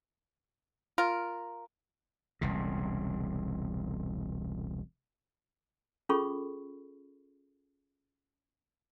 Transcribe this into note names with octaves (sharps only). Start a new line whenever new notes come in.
F4 A#4
E1 C2 C#3
C#4 F4 G#4 A4 B5 C#6